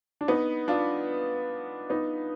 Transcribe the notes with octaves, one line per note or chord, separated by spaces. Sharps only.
D4
B3 D#4
D4 F4
B3 D#4